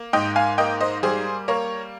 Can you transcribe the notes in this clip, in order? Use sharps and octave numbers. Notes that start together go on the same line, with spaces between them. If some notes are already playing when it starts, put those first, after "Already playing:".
Already playing: A#3
G#2 D#5 G5
F5 G#5
A#3 D#5 G5
C5 D#5
G3 G#4 C5
A#3 A#4 C#5